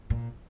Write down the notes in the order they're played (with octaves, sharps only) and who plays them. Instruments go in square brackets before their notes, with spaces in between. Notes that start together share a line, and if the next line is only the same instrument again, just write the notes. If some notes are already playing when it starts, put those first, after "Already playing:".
[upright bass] A#2